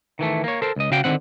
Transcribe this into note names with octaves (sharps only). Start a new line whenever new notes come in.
D#3 E3 A3
A#3 C#5
A4 A#4 C5
C#2 D#5
C#3 F#4 F5 G5
D3 D#3 C4 F#5